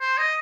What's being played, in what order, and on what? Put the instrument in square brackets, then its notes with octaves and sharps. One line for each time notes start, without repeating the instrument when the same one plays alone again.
[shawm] C5
D#5